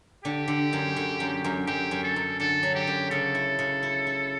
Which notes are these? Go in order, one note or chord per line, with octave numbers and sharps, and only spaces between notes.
D3 G4
D3
F#2
D3
F#2
F#2
F#2 G4
F#2
A4
F#2
D3 A4
F#3
G4
F#2
C#3 A4
E4
C#3
E4
E4